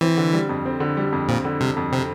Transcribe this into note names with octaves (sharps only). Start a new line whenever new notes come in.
E3 C4
D3
G3
F2
C4
D3
G3
F2
A#2 C4
D3
C3 G3
F2
C3 C4